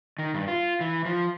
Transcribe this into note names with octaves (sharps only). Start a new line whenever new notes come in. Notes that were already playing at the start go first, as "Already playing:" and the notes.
D#3
G2
F4
E3
F3